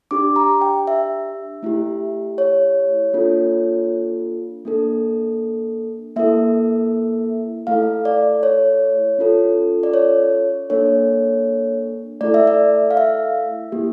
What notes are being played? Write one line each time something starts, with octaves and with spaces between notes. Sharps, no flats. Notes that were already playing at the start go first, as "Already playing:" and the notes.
D4 G4 D6
A#5
G5
E5
A3 E4 G4
C#5
A#3 D4 F4 A4
A#3 D4 A4
A#3 E4 A4 E5
A3 E4 A4 F5
D5
C#5
C#4 F4 A4
D5
C#5
A#3 D4 A4 C#5
A3 E4 A4 D5
E5
D5
F5
E5
A#3 E4 G4